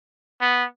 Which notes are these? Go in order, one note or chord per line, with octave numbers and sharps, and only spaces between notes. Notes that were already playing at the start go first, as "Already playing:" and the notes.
B3